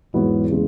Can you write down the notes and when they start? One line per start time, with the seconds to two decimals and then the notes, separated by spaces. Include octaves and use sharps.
0.14 E2 G#2 F#3 B3 E4
0.51 C#3 G#3